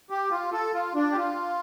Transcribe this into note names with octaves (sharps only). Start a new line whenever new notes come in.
G4
F4
A4
F4
D4
G4
F4